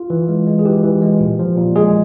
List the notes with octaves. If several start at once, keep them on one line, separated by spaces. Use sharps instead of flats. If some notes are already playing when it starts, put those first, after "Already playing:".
Already playing: F4
E3
G#3
G#3
G#4
E3 G4
E3
G#3
A#2
F3
A#2
G#3 G#4